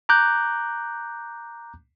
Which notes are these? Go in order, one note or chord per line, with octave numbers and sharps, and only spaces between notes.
A#5 D6 F#6 G6